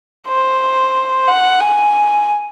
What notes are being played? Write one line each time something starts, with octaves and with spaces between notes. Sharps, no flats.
C5
F#5
G#5